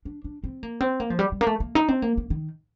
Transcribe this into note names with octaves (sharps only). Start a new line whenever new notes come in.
D4
D4
C4
A#3
C4
A#3
F3
G3
G3
A#3
A3
A#3
D#4
C4
A#3
A#3
D#3